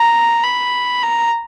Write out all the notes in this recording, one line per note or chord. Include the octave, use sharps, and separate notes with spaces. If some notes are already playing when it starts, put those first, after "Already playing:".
Already playing: A#5
B5
A#5